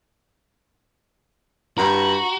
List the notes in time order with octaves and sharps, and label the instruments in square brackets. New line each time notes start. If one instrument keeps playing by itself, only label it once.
[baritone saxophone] G2 [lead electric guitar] F#4 [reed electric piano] A#5